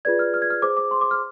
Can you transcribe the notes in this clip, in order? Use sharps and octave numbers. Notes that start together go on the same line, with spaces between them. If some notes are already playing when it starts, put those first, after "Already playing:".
F4 G#4 B4 D5 G#6
F6
F6
G#6
F6
G#4 C5 D6
D6
C6
D6
F6